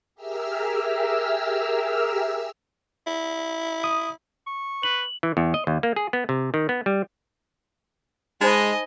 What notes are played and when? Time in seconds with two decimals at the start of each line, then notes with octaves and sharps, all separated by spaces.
0.15 G4 G#4 A#4 E5 E6 F6
3.07 E4
3.84 D#6
4.47 C#6
4.83 B4 F#7
5.23 E3
5.37 E2
5.54 D#5
5.67 D#2
5.83 A#3
5.96 G#4
6.13 B3
6.29 C3
6.54 D#3
6.69 B3
6.86 G3
8.41 G#3 D#4 C5 D#5 G#5 B5